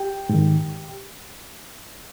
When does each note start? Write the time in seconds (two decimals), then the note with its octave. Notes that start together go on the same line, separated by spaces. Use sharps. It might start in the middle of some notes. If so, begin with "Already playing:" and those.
Already playing: G4 G5
0.29 G#2 D#3